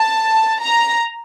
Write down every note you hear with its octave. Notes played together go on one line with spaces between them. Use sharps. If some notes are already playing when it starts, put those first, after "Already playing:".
Already playing: A5
A#5